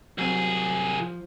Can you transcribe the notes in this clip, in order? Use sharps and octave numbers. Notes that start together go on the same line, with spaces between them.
C2 F#3 C4 G#4
F3